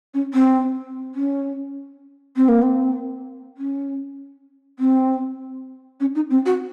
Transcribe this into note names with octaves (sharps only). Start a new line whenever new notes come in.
C#4
C4
C#4
C4
A#3
C4
C#4
C4
C#4
D#4
C4
F#4